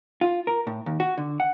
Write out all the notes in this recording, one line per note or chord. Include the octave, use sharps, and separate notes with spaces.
F4
A#4
A2
D#2
F#4
D3
F#5